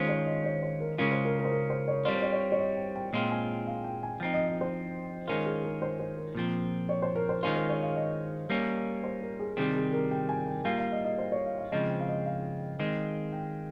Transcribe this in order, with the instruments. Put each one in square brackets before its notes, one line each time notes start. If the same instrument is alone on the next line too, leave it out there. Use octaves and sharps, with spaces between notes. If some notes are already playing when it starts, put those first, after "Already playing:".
Already playing: [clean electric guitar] D#3 G#3 C#4 F4 [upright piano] C5
[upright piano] C#5
D#5
C#5
C5
A#4
[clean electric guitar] C#3 G#3 C#4 F4 [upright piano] A#4
[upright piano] C5
A#4
A#4
C5
A#4
C5
C#5
[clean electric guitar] G3 C4 F4 [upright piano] C#5
[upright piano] C5
C#5
C#5
C#5
D#5
G5
G5
[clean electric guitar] A#2 G#3 C4 F4 [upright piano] G5
[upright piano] G#5
G5
F5
G5
G#5
[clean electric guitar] F3 C4 D#4 [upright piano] G5
[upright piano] D#5
D#5
C5
[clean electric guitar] D#3 G#3 C#4 F4 [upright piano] A#4
[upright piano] G#4
A#4
C5
C5
A#4
[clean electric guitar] A#2 F3 C4
[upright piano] C#5
C5
A#4
C5
[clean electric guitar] D#3 G#3 C#4 F4 [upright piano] C5
[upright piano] C5
C#5
F5
D#5
[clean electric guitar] G3 A#3 C#4
[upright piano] C5
A#4
G#4
[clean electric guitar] C3 D#3 G3 C4 [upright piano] G#4
[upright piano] G#4
A#4
G5
G#5
G5
[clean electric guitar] G3 A#3 F4 [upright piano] F5
[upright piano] F5
D#5
D#5
C5
C#5
F5
F5
[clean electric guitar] C#3 F3 G#3 C4 [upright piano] D#5
[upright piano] G5
F5
D#5
F5
[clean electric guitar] D#3 G#3 C4
[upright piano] G5